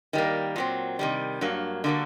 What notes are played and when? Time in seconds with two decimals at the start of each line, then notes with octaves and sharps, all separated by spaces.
0.13 D#3 G3 A#3
0.56 A#2 F#3 C4
0.99 C3 D#3 G3
1.41 G2 F#3 A#3
1.84 D3 G3 A#3 F#4 A4